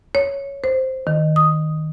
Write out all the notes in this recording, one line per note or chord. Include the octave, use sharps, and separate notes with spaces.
C#5
C5
D#3
D#6